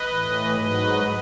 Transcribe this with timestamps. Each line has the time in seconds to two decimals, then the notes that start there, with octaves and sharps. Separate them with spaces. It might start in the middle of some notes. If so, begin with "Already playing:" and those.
Already playing: B4 D#5
0.09 A2 E3
0.54 G#2 F#3 B4 D#5